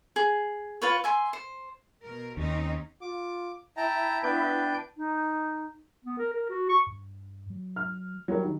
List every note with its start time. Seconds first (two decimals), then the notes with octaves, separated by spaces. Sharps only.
0.16 G#4
0.82 F4 B4 C#5
1.04 E5 G#5 C6
1.33 C5
2.04 B2 A#4
2.37 D#2 C4 C#4 D#4
3.01 F4 D6
3.77 E4 E5 G5 A5 A#5
4.23 B3 D4 B4 G5 G6
4.97 D#4
6.05 B3
6.18 A#4
6.33 A#4
6.49 F#4
6.69 C#6
6.87 G2
7.50 F#3
7.76 F6
8.28 F#3 G3 A#4
8.44 D#3